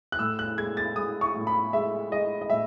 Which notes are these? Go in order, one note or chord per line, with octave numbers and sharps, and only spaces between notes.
F#6
A2 E6
F#6
G#3 G#6
A6
G#3 D#6
C#6
A2
B5
G#3 E5
G#3 D#5
D#5
A2 E5